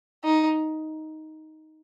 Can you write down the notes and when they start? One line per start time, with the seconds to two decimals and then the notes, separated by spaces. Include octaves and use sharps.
0.24 D#4